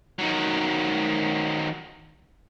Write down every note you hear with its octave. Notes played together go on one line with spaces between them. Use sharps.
D#3 F#3